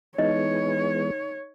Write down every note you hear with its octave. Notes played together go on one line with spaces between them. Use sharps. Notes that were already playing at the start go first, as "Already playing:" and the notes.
E3 G#3 B3 D#4 C#5 D#5